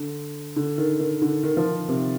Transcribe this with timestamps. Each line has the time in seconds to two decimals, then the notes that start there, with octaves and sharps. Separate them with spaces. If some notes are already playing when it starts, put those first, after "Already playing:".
Already playing: D3
0.56 D3
0.78 D#3
1.00 D#3
1.22 D3
1.43 D#3
1.57 F3
1.65 D#3
1.88 C3